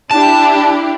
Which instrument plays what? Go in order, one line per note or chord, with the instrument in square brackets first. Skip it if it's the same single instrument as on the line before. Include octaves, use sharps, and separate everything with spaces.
[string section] D4 E4 G4 [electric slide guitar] A5